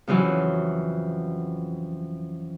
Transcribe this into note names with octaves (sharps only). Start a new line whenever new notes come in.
F2 C#3 E3 F#3